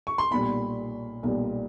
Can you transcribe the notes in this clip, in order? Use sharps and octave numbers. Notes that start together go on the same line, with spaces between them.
C#6
C6
B1 A#2 G3 B5
B1 A#2 G3